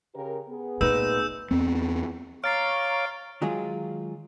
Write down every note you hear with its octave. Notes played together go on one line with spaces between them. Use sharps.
C#3 G4 A#4
B3 G#4
A#2 A3 D#4 B4 E6 G6 E7
E2 B3 C4
C#5 F5 A#5 C#6 D6 F6 A6 C7
D#3 F#3 G#3 D#4 F4 G#4